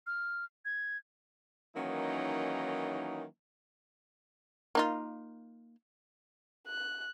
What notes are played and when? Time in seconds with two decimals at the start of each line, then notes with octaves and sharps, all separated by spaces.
0.07 F6
0.65 G#6
1.76 D#3 E3 F#3 A#3 C#4 D#4
4.75 A#3 D#4 F4
6.68 F#6